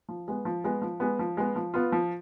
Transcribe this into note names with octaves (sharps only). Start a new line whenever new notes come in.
F3
G#3 B3
F3
G#3 B3
F3
G#3 B3
F3
G#3 B3
F3
B3 F4
F3